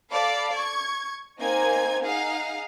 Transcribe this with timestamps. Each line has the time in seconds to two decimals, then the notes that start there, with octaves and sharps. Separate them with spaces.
0.11 A4 D5 F5 B5
0.54 C#6 G#6
1.39 A#3 C4 D#4 G#5 G#6
2.03 D#4 G#4 F5 F#5